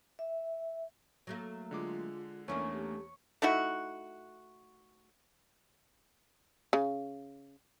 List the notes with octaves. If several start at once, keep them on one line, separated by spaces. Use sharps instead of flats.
E5
F#3 A3 A#3
D3 G#3 F4 D6
E2 A3 A#3 C#4 D4 C#5
G4
A3 D#4 E4 F#4
C#3